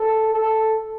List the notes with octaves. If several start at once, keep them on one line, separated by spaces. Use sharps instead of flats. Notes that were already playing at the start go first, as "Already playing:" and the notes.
Already playing: A4
A4